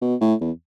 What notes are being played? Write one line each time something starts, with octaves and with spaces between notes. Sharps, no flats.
B2
A2
E2